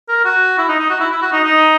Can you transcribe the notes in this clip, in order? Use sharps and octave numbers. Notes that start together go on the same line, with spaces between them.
A#4
F#4
E4
D#4
D#4
F#4
E4
E4
F#4
D#4
D#4